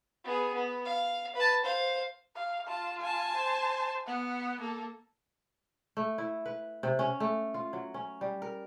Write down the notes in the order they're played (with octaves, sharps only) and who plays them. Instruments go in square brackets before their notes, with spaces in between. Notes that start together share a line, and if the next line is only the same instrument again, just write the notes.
[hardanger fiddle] B3 G#4
B3
F5
B4 A5
C5 F5
[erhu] F5
[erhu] F4 [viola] A5
[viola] G#5 A5
[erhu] C5
[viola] B3 [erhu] F#5
[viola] A#3 [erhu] A4
[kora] A3
E4
B4
C3
C#4
A3
F4
F#3
C#4
G3
A#4